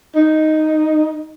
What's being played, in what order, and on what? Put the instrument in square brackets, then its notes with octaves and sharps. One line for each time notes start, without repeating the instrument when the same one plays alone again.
[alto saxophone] D#4